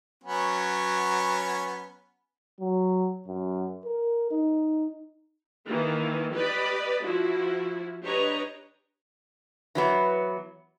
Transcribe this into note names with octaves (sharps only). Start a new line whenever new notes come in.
F#3 B3 C#4
F#3
F#2
A#4
D#4
D#3 E3 A#3
G4 B4 D5 D#5 B5
F3 E4 F#4
D4 G4 B4 C#5 D#5 A#5
E3 F#3 B3